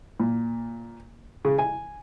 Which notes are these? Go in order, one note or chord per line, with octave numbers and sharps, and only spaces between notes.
A#2
C#3
G#5